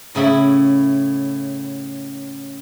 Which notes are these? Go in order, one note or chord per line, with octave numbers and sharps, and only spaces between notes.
A2 C#3 E4 B5